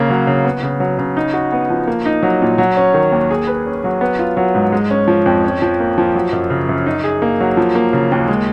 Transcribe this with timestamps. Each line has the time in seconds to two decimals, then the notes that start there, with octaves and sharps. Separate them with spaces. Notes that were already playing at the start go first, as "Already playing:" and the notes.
Already playing: C#3 A#3
0.10 F#3
0.27 C#3
0.44 B3
0.63 C#3
0.80 F#3
0.99 C#3
1.17 D#4
1.34 F#4
1.52 B3
1.70 F3
1.87 A#3
2.06 D#4
2.23 F#3
2.42 A#2
2.58 F#3
2.77 C#4
2.94 D#3
3.12 D#2
3.31 G#4
3.47 B4
3.66 C#4
3.84 F#3
4.01 B3
4.19 F4
4.37 F#3
4.55 G#2
4.72 G#3
4.90 C#4
5.08 F3
5.26 F2
5.44 C#4
5.62 F3
5.80 A#3
5.98 F3
6.15 F#3
6.32 F#2
6.50 C#3
6.69 F#2
6.86 D#4
7.04 G#4
7.22 A#3
7.40 F#3
7.57 F3
7.75 A#3
7.93 C#3
8.12 D#2
8.28 G#3